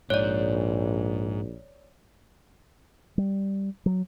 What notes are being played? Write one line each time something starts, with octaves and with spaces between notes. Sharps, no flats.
A#1 G#2 C#5 D5
G3
F#3